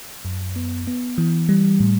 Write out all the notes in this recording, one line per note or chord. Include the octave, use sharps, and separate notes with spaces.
F#2
B3
B3
E3
G3
A2